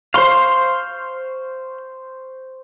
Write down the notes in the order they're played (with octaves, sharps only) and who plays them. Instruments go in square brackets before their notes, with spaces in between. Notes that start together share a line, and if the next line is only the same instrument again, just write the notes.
[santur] C5 C#6 [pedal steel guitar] F5 C6